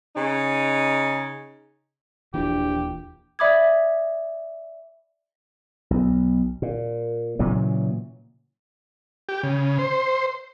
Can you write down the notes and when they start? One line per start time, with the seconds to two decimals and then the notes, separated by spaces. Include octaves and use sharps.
0.15 C#3 D#4
2.34 D#1 A#1 E3 G4
3.39 D5 E5 B5 D6 D#6 G#6
5.91 B1
6.62 A#2
7.39 A#2 C#3 E3 F#3
9.29 G4
9.43 C#3
9.79 C5